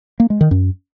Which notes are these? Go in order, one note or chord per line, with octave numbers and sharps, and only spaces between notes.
A#3
G#3
D#3
F#2